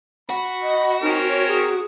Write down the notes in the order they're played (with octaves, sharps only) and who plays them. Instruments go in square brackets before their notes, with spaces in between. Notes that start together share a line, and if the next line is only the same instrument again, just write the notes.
[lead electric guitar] F#4 [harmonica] B5
[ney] D#5
[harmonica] C4 C#4 A#4 [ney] D#4
[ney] C#5
G#4